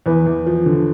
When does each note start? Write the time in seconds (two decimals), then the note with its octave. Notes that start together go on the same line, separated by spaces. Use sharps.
0.06 E2 B4
0.26 E2
0.46 F3
0.66 D3